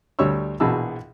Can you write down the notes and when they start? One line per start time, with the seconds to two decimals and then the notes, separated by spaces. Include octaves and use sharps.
0.19 D2 G3 C#5 C#6 E6
0.60 A#1 B2 E3 G#4 A5 E6